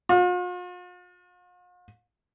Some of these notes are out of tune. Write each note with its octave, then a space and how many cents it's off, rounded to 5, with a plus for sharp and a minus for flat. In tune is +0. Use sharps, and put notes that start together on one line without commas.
F4 +45